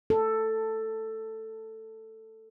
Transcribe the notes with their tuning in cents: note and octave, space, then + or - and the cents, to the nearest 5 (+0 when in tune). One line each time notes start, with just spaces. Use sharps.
A4 +10